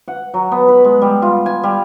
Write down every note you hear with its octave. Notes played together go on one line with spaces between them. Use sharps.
F#5
F#3
B3
B4
G#3
G3
F4
G#5
G3